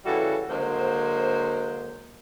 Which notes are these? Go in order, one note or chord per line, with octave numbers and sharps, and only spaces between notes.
C#3 E3 G3 E4 F#4 A4
D3 F#3 G#3 A#3 C5